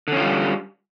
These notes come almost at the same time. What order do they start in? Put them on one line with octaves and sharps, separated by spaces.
D3 C#4 F4 G3